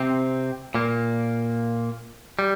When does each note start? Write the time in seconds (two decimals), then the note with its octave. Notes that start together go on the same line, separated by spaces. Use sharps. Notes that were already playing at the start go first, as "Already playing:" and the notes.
Already playing: C3 C4
0.74 A#2 A#3
2.39 G3